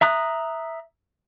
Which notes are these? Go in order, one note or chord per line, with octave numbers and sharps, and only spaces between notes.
E5 A#5 D#6 F#6